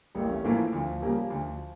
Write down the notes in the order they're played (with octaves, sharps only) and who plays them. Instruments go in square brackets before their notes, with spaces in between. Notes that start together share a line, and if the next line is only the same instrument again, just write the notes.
[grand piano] A1 [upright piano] G3 A#3
[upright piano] A3 C#4
[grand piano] A2 E3 A#3 E4 [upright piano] F3 A3
[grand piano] D2 [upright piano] F3
[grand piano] C#3 G3 A#3
D2